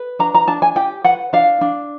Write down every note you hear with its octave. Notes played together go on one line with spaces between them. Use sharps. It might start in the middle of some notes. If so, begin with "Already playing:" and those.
Already playing: B4
D4 A#5
A#5
D4 A5
G#5
G4 G5
B4 F#5
D4 F5
D4